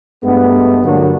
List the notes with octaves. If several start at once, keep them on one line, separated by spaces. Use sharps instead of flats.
G2 G#3 A3 B3
G2 D3 F#3 A#3 D4 F#4